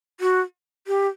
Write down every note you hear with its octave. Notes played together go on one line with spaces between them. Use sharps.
F#4
G4